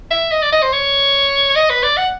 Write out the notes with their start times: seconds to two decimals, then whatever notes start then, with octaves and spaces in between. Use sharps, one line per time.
0.11 E5
0.31 D#5
0.42 D5
0.52 D#5
0.62 C5
0.73 C#5
1.56 D#5
1.70 B4
1.83 D5
1.97 F#5